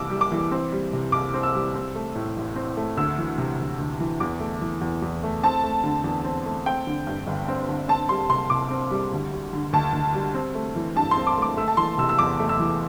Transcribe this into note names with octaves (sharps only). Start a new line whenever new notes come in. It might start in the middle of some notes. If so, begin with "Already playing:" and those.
Already playing: C2 C3 E3 D6 E6
G3
D6
E3
C4
G3
C3
C2 D6
C4
E6
G3
C4
A3
A2
A1
C4
A3
D2 E6
E3
C3
D2
D2
E3
E2 D6
A3
E3
E2
E2
A3
C4 A5
A3
D3
E2
C4
A3
C4 G5
D3
G2
G1
C4
D3
C4 A5
G3 C6
C3 C6
C2 D6
C4
G3
D2
G3
D3
D2 A5
D2
G3
C4
A3
E3
G2 A5
C6
C4
D6
A3 D6
A3 E6
A5
E3 C6
C3 E6
E6
E2 D6
A3
E6
E3